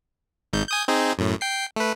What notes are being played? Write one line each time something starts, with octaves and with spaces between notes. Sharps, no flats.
G#1 G#2 G6
G#5 D#6 G6
C4 D#4 G#4
F#2 A2
G5 C7
A3 B4